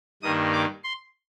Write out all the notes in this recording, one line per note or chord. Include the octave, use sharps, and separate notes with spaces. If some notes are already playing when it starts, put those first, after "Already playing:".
G2 D#3 A#3 D#6
D6
C6